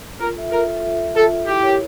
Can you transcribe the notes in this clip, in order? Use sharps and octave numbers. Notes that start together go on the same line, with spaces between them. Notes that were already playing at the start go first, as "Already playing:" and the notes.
F4 A#4
A4 E5
F4 A#4
A4 E5
F4
A4 E5
F4 A4
A4 E5
E4 G4
A#4 C#5